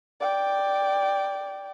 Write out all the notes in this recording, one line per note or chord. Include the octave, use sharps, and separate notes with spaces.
D5 G5